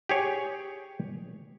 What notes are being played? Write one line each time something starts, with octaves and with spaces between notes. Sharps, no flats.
G4 G#4 C#5